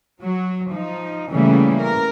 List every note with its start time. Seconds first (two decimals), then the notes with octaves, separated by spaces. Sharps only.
0.22 F#3
0.71 F3 D#4
1.31 C#3 E3 G3 A3 A#3 C#4
1.81 A#4